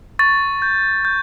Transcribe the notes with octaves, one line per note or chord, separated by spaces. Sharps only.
C#6 A6
G6
G6